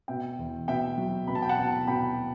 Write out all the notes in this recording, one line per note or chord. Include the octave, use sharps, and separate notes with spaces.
B2 E5 G5
E2
B2 E5 G5
F#3
B2 B5
A5
G5
F#5 A5
B2
B2 G5 B5